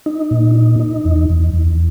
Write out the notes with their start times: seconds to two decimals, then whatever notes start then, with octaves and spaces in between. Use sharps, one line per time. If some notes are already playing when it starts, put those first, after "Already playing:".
0.06 D#4
0.31 A#2
0.55 D#4
0.80 D#4
1.05 E2
1.30 E2
1.54 E2